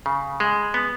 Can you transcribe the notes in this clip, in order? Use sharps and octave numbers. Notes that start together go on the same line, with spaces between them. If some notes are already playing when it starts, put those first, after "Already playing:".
C#3
G#3
B3